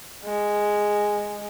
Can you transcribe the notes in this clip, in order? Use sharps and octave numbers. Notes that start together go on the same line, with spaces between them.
G#3